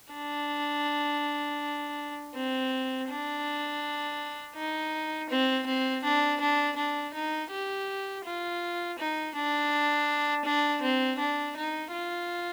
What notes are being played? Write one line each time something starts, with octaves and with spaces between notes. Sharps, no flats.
D4
C4
D4
D#4
C4
C4
D4
D4
D4
D#4
G4
F4
D#4
D4
D4
C4
D4
D#4
F4